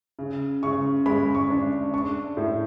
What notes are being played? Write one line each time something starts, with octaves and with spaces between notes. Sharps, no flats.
C#3
C#3 C#6
G#3 B5
C#6
D4
D4 C#6
A2